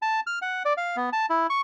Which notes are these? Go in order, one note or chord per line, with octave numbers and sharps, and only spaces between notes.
A5
F6
F#5
D5
F5
B3
A5
E4
C#6